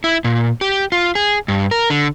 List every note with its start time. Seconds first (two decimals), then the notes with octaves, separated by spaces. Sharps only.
0.04 E4
0.24 A#2
0.61 G4
0.92 F4
1.15 G#4
1.48 G2
1.71 A#4
1.90 D3